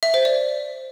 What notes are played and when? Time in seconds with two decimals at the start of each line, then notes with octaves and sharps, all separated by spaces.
0.03 E5
0.14 C5
0.25 D5